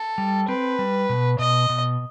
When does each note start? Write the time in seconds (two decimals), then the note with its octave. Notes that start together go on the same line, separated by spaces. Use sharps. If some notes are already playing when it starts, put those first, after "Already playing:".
Already playing: A4
0.18 G3
0.48 C4 B4
0.79 G3
1.09 B2
1.39 B2 D#5
1.69 B2